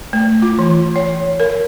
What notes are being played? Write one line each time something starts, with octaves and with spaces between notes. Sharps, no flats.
A3
F4
E3
C#5
A#4